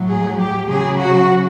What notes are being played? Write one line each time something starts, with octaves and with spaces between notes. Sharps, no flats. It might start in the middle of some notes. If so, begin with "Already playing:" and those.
Already playing: A2 F#3
G#4
G4
C#3 F#3 G#4
F#4